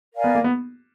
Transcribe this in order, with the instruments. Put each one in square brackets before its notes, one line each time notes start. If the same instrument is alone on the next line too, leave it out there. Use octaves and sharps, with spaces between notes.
[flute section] A#4 D5 F5 G#5
[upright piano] B3
A#3
B3